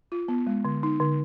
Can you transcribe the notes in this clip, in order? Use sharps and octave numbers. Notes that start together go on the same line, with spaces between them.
F4
B3
G#3
D3
D#4
D3